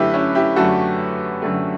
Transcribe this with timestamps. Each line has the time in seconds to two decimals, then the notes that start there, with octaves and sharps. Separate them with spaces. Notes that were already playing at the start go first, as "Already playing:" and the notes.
Already playing: F#2 D3 A3 E4 G4 B4
0.14 C#4 E4
0.35 E4 G4
0.56 F#2 D3 A3 F#4 A4
1.42 F#2 D3 A3